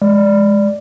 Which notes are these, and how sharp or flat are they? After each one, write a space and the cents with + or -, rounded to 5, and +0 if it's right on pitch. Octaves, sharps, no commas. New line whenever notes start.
G#3 +0 D5 +0